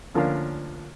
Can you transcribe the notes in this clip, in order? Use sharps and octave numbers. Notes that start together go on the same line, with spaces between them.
D2 F3 A#3 C#4 D4 F5